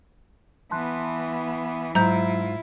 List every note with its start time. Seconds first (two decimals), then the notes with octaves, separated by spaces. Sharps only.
0.71 E3 B3 A5 C6 F#6
1.95 G#2 F#3 E4 F4 A#5 G6